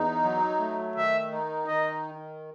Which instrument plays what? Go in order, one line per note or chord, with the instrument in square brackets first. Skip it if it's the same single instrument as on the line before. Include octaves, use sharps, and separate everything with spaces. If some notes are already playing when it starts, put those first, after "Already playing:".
Already playing: [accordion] E2 D#4
F#3
A3
[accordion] D#3 [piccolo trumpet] E5
[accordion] D#4
[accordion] D#3 [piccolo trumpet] D#5